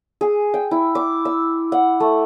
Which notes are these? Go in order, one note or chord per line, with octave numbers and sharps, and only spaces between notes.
G#4
G5
E4
D6
E6
F#5
A3